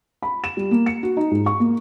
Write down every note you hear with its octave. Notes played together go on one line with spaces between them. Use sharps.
B5
E7
G3
A#3
C#7
F#4
D#4
G#2
C#6
A#3